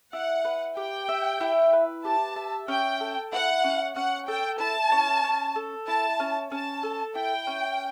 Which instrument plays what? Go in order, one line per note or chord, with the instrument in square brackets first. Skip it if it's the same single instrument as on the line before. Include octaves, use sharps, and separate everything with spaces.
[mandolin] E4 [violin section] F#5
[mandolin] B4
[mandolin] G4 [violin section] G5
[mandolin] E5
E4
B4
[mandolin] G4 [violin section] A5
[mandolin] E5
[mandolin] C#4 [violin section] G5
[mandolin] A4
[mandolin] E4 [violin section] F#5
[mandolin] C#4
[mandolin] C#4 [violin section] F#5
[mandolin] A4 [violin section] G5
[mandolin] E4 [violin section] A5
[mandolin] C#4
C#4
A4
[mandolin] E4 [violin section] A5
[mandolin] C#4
[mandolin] C#4 [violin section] A5
[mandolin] A4
[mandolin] E4 [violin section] G5
[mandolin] C#4